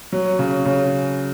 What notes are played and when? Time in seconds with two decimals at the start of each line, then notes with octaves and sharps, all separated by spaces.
0.13 F#3
0.39 C#3
0.66 C#3